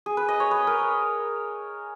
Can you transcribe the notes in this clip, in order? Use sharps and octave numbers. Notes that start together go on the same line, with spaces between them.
G#4
B4
D#5
C#5
B4
A#4